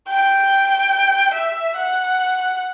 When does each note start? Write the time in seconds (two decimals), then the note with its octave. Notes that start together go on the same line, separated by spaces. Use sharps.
0.09 G5
1.34 E5
1.76 F#5